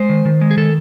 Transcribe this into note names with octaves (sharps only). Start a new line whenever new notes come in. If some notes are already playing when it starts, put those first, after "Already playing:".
Already playing: G#3 C5
D#3
D#3
G#3
G#4
D#3 A4